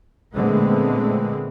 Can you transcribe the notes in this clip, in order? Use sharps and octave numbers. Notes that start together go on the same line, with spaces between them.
A#2 D3 G#3 A3 B3 C4